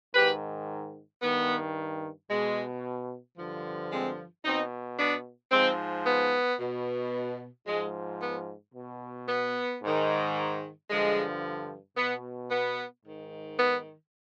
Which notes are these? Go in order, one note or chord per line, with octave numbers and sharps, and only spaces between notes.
G#2 D#3 G4 B4
G2 D#3 B3
B2 G#3
G2 D3 F3
G#3 C4
B2 C4 D#4
B3 D4
G#2 F3 G#3 C4
B3
B2
G#2 F3 G#3
B3
B2
B3
G#2 D#3
G2 D3 F3 G#3
B2 B3
B3
G#2 D#3
B3